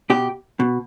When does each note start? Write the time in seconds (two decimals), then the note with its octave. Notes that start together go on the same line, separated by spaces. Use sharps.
0.10 B2 G4
0.60 B2